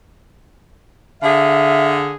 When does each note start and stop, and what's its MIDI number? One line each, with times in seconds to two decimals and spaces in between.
1.22 2.16 50
1.22 2.16 68
1.22 1.95 76
1.22 2.16 77